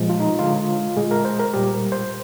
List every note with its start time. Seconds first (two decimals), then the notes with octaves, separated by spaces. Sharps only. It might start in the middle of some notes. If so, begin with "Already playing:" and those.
Already playing: A#2 F3 G#3
0.09 F4
0.20 D#4
0.39 D3 G#3 F4
0.97 A#2 G#3 G#4
1.11 A#4
1.25 C5
1.39 A#4
1.54 A#2 G3 G4
1.74 A#4
1.92 C5